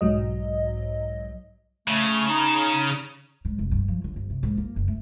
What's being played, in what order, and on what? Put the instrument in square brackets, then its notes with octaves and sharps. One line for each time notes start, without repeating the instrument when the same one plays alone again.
[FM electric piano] B1 G#2 F#3 D#5
[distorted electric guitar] C#3 [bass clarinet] A3
[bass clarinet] D#4
[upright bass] G#2
F1
G2
F3
D3
G1
C3
G#2
A#3
F#1
A3